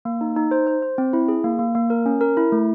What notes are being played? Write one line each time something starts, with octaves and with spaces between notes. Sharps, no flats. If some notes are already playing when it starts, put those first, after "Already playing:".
A#3
D#4
D#4
C5
C5
C5
C4
E4
G#4
A#3
A#3
A#3
A#4
C#4
A#4
E4
A3